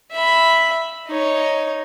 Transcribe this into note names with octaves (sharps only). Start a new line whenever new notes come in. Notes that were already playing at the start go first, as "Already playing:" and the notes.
E5 B5
D#4 C#5